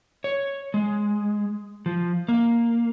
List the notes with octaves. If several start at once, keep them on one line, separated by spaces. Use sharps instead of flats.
C#5
G#3
F3
A#3